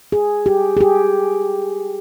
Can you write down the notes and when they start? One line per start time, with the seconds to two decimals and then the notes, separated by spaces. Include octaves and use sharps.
0.12 G#4
0.46 G4
0.77 G#4
0.81 G4